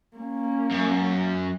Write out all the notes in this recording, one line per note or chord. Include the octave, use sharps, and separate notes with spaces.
A#3 C#4
F#2